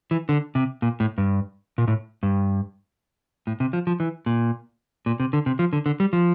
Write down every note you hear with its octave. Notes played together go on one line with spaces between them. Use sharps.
E3
D3
C3
A#2
A2
G2
A#2
A2
G2
A2
C3
F3
F3
E3
A#2
A#2
C3
D3
C3
F3
D3
D3
G3
F3